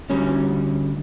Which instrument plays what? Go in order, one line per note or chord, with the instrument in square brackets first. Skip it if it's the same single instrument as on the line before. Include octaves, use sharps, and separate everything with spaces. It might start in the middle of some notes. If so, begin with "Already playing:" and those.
[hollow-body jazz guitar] D2 G3 C#4